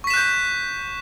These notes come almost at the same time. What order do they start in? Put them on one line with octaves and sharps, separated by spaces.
C#6 B6 E7 F#6 G6